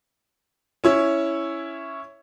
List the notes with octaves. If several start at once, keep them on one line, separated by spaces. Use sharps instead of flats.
C#4 E4 C#5